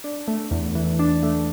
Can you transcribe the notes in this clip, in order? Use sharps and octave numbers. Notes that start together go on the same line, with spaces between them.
D4
A3
E2
E3
D4
A3